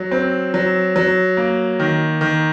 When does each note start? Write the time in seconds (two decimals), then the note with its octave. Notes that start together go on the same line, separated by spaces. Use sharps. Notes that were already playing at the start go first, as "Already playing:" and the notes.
Already playing: F#3
0.11 C4
0.54 F#3
0.96 F#3
1.37 A#3
1.79 D#3
2.21 D#3